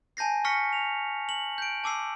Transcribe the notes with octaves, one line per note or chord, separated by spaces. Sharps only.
G#5 A5 G6 A#6 C7
C#6 F6 A#6 B6 C#7
F7
F#7
G6 D7
A5 D6 E6 C7